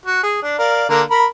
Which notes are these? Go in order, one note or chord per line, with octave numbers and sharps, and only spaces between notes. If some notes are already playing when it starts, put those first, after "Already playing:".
F#4
G#4
D4
A#4 D5 F5
D3 A#3 A#4
A#4 B5